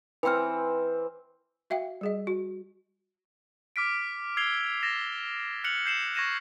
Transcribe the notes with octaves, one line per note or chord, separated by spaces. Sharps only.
E3 C4 B4 G#5 F6
F#4 E5 F5 G5
G3 G#4 D#5
F#4
D6 F6 B6 D7
E6 G#6 C7 F7 G7
E6 A6 A#6 E7
F6 F#6 C#7 F7 F#7
G6 C7 E7 F#7
C#6 G#6 A#6 D#7 E7